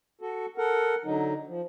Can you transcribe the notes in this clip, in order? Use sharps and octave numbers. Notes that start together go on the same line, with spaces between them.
F#4 A4
A4 A#4 F#5
D3 F#3 D#4
F3